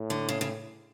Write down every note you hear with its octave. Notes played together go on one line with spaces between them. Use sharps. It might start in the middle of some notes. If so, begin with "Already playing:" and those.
Already playing: A2
D3
C#3
C#3